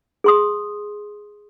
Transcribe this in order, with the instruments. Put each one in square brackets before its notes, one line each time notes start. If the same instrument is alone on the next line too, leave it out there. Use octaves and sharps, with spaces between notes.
[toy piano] G#4 C6 D#6